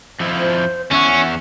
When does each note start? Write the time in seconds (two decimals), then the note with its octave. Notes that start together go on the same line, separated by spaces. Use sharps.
0.20 F2 F3 E4
0.39 C5
0.92 E2 C#4 E5 F#5 C#6